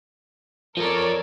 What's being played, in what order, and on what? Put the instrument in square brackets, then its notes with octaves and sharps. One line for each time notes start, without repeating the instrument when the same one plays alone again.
[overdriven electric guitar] F3 A4 [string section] A#4 C#5 D5